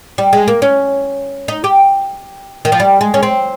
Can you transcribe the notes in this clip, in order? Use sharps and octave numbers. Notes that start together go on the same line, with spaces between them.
G3
G#3
A#3
C#4
D#4
G4
D#3
F3
G3
G#3
C#4
C4